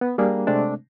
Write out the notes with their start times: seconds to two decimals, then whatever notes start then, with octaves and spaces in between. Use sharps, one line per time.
0.01 B3
0.18 G3 A#3 D4 G#4
0.47 C3 G#3 A3 C4 D4